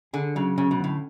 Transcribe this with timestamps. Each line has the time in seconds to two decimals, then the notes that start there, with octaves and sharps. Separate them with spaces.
0.13 D3 G#4
0.36 C#3 F#3
0.58 C#3 C#4
0.71 B2
0.80 A2 D3